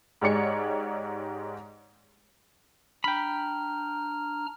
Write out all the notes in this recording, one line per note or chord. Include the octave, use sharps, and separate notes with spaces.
G#2 G#3 G4 C#5 D5 C#7
D4 G5 A#5 B5 F6